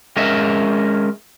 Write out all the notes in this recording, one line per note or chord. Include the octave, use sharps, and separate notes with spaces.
G#3 C#4 A#4 D#5 E5